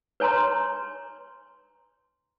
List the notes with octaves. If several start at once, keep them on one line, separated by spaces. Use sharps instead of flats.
B4 C#5 G#5 A#5 C6